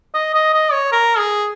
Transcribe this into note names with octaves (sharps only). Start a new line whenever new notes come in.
D#5
D#5
D#5
C#5
A#4
G#4